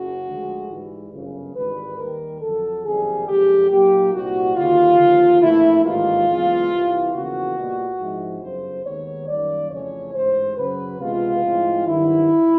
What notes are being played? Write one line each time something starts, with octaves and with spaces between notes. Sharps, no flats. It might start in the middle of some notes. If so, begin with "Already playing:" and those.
Already playing: F#1 F#2 C#3 F#4
D2 D3 F3 G#3
G#2 E3 G3
G1 F#2 C#3
G#1 G#2 E3 G3 B4
D#2 D#3 G3 A#4
F2 D3 F#3 A4
F#1 F2 C3 D#3 G3 G#4
F#1 F2 D3 F3 G#3 G4
A#2 F#3 A#3 D#4 G4
C2 A#2 G3 C4 F#4
D#2 D3 G3 F4
D#2 D3 F3
A#1 A2 E3 A3 E4
A1 G#2 D#3 G3 A#3 F4
F#1 E2 C#3 E3 G#3
C2 C3 E3
E2 C#3 F3 A#3 F#4
A#2 G3 B3 D#4
G#2 F3 G#3 C4 E4
G1 F#2 C#3 C5
D#2 D#3 G#3 B3 D#4 C#5
F#2 D#3 G3 A#3 D5
F2 C#3 E3 A3 C#4 C#5
A1 G#2 E3 C5
F#2 C#3 F#3 B4
C#2 C3 E3 G#3 B3 F4
A2 F3 G#3 C4
G2 D#3 F#3 E4